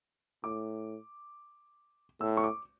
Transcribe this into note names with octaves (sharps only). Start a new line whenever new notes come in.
A2 D6
A2 E6
C#6
D6